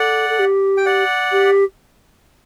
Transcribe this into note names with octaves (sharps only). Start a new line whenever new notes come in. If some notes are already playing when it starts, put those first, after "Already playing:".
Already playing: A4 D5 F#5
A4
G4
G5
D5 F#5
G4